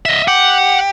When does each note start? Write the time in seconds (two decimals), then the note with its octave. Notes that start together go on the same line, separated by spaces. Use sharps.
0.05 D#5 E5
0.28 G4 F#5